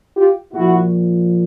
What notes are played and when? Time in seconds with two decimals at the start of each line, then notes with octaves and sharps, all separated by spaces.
0.15 F4 G4
0.54 A#2 F3 E4 F#4